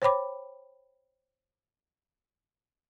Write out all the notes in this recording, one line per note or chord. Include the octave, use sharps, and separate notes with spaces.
C5 C#5 G5 B5 D6